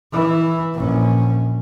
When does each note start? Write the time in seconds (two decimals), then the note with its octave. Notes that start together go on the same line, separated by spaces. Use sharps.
0.12 E3 E4
0.75 A#1 C#4